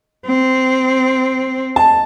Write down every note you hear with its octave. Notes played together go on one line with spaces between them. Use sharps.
C4
A5